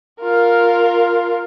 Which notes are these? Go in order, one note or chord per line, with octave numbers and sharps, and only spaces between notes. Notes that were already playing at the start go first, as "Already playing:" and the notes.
F4 A#4